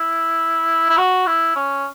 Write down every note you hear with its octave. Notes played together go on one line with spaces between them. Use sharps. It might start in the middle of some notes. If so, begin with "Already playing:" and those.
Already playing: E4
E4
F#4
E4
C#4